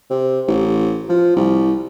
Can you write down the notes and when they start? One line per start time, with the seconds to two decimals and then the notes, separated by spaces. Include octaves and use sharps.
0.10 C3
0.48 A1
1.09 F3
1.36 C2